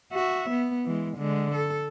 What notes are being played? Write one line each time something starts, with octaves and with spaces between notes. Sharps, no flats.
F#4 E5
B3
E3 G#3
D3 G#3
A4